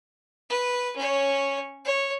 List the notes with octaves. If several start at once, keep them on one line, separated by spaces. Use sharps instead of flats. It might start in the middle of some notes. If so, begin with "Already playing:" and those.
B4
C#4 C#5
C#5